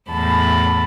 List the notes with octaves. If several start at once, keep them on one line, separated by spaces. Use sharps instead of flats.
E2 A2 A5 B5